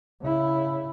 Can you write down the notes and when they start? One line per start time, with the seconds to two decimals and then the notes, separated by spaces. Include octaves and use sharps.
0.21 C#3 E4